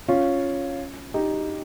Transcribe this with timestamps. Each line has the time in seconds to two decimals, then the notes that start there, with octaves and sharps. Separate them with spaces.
0.08 C#4 F4
1.14 D#4 G4